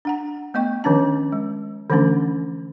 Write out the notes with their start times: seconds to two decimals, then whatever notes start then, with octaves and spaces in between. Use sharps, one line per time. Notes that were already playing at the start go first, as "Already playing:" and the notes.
0.05 D4 F#5 A#5
0.54 A3 B3 D#5 G5 C#6
0.84 D#3 F3 C#4 D4 A5
1.32 G#3
1.90 D3 E3 F3 A3 C#4 D4